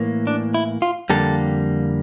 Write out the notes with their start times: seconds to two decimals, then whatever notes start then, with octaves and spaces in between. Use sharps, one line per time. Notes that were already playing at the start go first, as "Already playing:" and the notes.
Already playing: A2 E3 A#3
0.27 D4
0.54 E4
0.82 F4
1.10 F2 D3 G3 A#3 A4